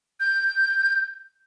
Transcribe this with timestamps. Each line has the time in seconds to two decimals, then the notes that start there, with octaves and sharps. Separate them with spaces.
0.20 G6